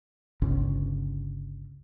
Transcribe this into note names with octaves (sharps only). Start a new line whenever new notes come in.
G1 C#2 C#3